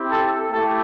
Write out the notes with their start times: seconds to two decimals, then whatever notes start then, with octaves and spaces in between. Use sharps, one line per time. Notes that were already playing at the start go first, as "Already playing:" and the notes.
Already playing: C4 E4 G4
0.09 A4
0.51 A3 E4 G4 A4